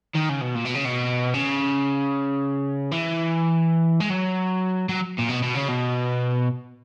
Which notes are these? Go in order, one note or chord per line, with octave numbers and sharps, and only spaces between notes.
D#3
C#3
B2
A#2
B2
C#3
B2
C#3
E3
G#3
F#3
F#3
A#2
B2
B2
C#3
B2